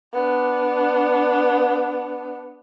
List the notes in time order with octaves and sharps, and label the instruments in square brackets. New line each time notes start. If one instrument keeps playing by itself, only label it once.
[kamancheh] B3 D4